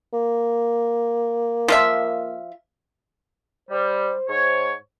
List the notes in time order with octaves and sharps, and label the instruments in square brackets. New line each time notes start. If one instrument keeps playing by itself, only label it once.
[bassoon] A#3
[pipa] F3 F4 E5
[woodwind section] G3 [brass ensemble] C5
[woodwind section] G#2 C#5